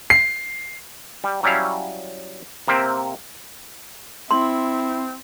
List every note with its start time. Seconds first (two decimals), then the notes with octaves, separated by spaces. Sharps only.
0.10 C7
1.24 G3
1.43 F#3 G3 C#4 E4 F5
2.68 C3 A#3 C4 E5
4.31 C4 E4 C6